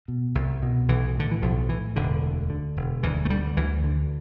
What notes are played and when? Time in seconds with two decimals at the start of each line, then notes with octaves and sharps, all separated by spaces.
0.08 B2
0.35 C2
0.63 B2
0.88 B1 E3
1.15 A2 D3
1.31 E3
1.42 B1 F3
1.69 A2 E3
1.96 E1 D3
2.23 D2
2.50 D3
2.76 E1
3.03 D2 E3
3.25 A3
3.30 D3 G3
3.57 D2 E3
3.84 D3